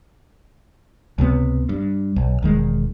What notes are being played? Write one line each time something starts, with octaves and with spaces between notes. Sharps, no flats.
C#2 C3 G3 B3
G2
B1
E1 D#3 G#3